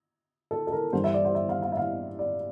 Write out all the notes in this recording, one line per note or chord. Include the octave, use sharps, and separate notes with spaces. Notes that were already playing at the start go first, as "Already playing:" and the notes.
A4
A4
A#4
G2 E3 G3 C5
E5
D5
C5
E5
F5
F5
E5
F5
D5